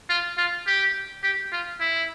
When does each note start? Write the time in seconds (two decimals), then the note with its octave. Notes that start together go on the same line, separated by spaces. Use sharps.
0.10 F4
0.38 F4
0.67 G4
1.23 G4
1.52 F4
1.80 E4